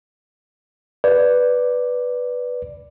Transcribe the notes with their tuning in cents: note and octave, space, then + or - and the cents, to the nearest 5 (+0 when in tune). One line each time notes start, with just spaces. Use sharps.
B4 +0 D5 +0